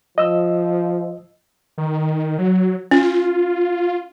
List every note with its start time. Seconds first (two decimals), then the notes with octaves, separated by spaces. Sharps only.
0.18 F3 D#5 E6
1.78 D#3
2.38 F#3
2.91 C#4 F4